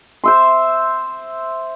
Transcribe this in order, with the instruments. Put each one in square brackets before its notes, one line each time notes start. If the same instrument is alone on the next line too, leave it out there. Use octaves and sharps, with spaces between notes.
[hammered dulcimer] C5 E5 C6